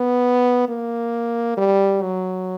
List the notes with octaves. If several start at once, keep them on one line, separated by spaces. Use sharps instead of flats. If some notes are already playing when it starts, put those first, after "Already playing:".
Already playing: B3
A#3
G3
F#3